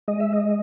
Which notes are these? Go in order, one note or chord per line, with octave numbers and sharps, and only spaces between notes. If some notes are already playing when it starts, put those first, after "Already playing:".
G#3 D#5
E5
D#5